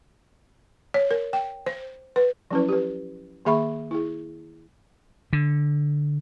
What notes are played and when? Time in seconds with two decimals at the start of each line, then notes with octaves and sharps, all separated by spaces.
0.94 C#5
1.11 A#4
1.33 G5
1.66 C5
2.16 B4
2.51 F3 F#3 C#4 E4 B4
2.69 G4 B4
3.45 D#3 A#3 G#4 E5 B5 C#6
3.91 E4 G#4
5.33 D3